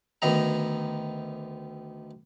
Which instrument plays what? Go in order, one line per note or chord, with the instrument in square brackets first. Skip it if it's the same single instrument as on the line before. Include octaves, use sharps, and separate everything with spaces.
[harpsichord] D2 D#3 B3 A#5